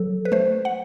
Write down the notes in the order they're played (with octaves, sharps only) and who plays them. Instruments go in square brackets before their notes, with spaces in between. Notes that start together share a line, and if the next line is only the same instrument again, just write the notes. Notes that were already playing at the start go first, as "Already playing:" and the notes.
Already playing: [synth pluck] F#3 A4
B4
A3 C5
F#5